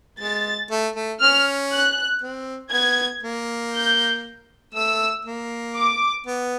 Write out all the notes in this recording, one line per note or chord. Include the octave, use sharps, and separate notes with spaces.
G#3 A6
A3
A3
C#4 F6
F#6
C4
B3 G#6
A#3
G6
A3 E6
A#3
D6
B3